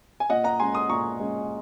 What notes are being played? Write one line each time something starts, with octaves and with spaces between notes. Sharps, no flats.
G#5
A#2 D#5 F#5
F#5 A#5
G#3 C#4 G#5 C6
C6 D#6
A#2 A#5 C#6
G#3 C#4